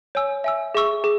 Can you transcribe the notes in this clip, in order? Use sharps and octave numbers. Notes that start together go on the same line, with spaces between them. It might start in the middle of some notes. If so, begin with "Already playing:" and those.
C#5 G#5 E6
E5 G#5 E6
G#4 E5 C#6 E6
G#4